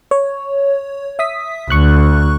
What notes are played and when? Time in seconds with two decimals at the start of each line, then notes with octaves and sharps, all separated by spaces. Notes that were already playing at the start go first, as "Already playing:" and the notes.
0.11 C#5
1.19 E5 D#6 B6
1.70 D2 C#6 F#6